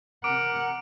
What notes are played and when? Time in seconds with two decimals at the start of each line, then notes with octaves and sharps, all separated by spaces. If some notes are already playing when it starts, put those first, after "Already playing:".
0.24 C3 A#4 F#5 D6 D7